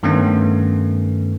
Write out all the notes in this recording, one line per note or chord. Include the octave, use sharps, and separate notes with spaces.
G2 D#3 A3 B3 C#4